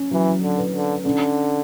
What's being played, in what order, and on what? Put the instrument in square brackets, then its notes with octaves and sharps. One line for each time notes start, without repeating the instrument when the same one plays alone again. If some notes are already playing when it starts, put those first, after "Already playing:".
Already playing: [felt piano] C#4
[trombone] E3 [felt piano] F#3
[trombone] D3
[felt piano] B4
[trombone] D3
[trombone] D3 [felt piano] C#4